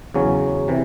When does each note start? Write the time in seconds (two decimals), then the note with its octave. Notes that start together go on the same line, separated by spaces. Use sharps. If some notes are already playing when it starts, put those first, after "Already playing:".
0.14 E2 C#3 F#3 C#4
0.68 C3 E3